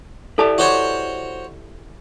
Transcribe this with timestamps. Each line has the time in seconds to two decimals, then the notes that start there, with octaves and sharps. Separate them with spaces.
0.38 E4 G4 A4 D5 A5 D6
0.58 F#4 C5 C#5